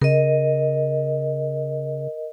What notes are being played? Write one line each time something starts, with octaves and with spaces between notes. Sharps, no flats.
C#3 A#4 D#5